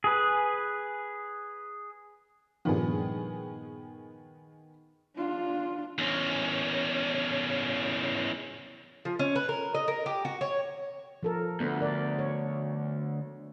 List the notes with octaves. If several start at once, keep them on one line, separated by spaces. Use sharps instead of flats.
G#4 B4
G2 A#2 D#3 F3 B3 G#4
D4 F4
E2 C#4
F3
C#4
B4
A#4
D#5
A#4
G4
F#4
C#5
F3 A4 A#4
D2 B3
A#4 D5
C#5